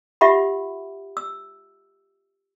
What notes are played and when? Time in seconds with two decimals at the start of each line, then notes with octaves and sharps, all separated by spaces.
0.21 F4 G4 E5 F#5 B5
1.17 E6